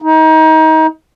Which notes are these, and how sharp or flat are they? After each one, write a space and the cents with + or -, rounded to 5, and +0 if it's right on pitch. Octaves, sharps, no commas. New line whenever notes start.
D#4 +30